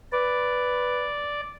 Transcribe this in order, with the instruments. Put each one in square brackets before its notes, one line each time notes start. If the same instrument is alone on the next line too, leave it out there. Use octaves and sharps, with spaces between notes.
[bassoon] B4 [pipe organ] D5